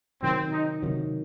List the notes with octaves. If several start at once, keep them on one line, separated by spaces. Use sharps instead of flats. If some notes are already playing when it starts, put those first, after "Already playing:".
C3 D#3 F#3 C4
D#4
C3 D#3 F#3